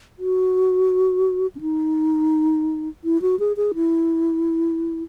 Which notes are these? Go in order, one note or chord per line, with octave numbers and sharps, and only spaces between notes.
F#4
C#4
D#4
E4
F#4
G#4
G#4
E4